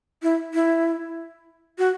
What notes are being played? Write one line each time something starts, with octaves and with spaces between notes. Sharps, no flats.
E4
E4
F#4